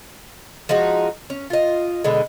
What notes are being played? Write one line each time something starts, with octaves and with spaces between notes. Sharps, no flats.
F3 G#3 D#4 F#4
C#4
F4 D#5
B2 D3 G#3